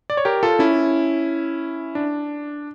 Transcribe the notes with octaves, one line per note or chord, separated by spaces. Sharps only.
D5
C#5
G4 A#4
F4 A4
C#4 E4
D4